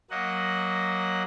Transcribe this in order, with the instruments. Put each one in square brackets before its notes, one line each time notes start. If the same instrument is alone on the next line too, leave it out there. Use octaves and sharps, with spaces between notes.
[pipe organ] F#3 A#3 D#5 F#5